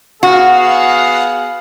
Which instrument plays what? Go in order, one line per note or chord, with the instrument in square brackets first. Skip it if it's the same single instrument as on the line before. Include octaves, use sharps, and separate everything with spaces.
[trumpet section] B3 G#4 F5 [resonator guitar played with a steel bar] F#4